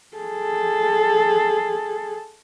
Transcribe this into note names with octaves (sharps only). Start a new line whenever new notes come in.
G#4 A4